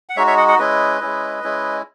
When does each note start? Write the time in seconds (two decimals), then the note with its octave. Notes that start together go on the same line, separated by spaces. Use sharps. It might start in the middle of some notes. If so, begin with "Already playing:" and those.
0.09 F#5
0.16 G#3 D#4 F#4 C#5 E5
0.27 C#5 E5
0.37 D#5 F#5
0.48 D#5 F#5
0.59 G#3 C#4 E4 B4 D#5
1.01 G#3 C#4 E4
1.43 G#3 C#4 E4